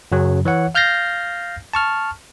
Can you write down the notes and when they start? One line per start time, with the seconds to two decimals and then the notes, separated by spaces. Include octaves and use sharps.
0.12 F#2 C#3 F#3
0.45 E3 C#5 F#5
0.75 F5 F6 G6 A6 A#6 C7
1.73 A5 C#6 F6